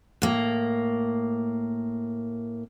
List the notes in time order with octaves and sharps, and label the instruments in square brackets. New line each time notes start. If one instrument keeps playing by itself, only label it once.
[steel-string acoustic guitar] A2 A#3